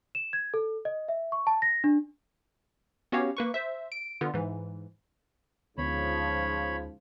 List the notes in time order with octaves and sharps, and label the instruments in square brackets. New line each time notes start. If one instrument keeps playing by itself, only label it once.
[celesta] E7
G#6
A4
D#5
E5
C#6
A5
A#6
D4
[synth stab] B3 C#4 F#4 G4 C#5 F5
A#3 B4 C#6
C5 E5
D7
D3 B3 F4
G#2 E3
[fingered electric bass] D2 B3 D4 [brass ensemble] G#2 C#3 F3 [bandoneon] C#5 B5